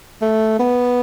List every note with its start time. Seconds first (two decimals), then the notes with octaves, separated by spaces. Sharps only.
0.22 A3
0.59 B3